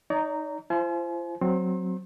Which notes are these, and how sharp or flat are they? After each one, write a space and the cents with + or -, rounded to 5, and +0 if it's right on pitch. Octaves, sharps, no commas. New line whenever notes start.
D#4 +0 D5 -45 A#5 -10
F4 -45 C5 +0 G#5 +40
F#3 +0 C4 -5 C6 +40